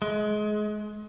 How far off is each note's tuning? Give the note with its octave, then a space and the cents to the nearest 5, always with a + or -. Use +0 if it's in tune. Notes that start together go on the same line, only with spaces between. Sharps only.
G#3 +25